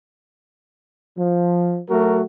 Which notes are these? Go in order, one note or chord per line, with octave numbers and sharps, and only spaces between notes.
F3
F#3 A3 F#4 A#4